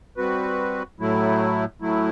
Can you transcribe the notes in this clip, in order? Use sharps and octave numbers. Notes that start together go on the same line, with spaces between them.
G3 C4 F#4 B4
A2 F#3 A3 E4
A2 F#3 A3 E4